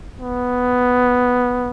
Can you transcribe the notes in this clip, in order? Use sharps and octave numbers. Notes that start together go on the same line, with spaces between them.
B3